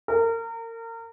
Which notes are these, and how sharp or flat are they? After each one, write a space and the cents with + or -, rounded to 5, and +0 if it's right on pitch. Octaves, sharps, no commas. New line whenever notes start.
A#4 -30